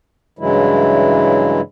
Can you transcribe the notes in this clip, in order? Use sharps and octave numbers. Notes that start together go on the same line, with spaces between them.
G2 C#3 E3 F#3 G#3 E4